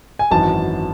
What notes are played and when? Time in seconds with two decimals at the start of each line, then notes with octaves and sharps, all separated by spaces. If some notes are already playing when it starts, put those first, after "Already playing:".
0.19 G#5
0.31 G#1 F#2 E3 A5